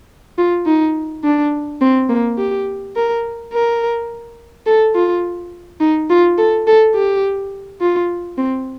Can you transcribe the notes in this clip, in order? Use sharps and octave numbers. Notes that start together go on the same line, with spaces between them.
F4
D#4
D4
C4
A#3
G4
A#4
A#4
A4
F4
D#4
F4
A4
A4
G4
F4
C4